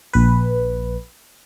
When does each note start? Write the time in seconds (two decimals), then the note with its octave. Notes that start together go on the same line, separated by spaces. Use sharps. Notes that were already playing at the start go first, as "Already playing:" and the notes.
0.13 A#1 B4